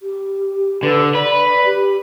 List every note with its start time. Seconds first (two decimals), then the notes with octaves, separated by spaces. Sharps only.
0.01 G4
0.83 D3 B4
1.15 B4 D5
1.46 D5
1.65 G4